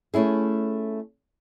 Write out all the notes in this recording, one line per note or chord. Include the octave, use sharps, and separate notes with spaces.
A3 C#4 E4 G#4